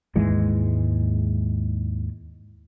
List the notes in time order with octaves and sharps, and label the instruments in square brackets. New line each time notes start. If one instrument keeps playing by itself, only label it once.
[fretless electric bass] D#2 G#2 E3 G#3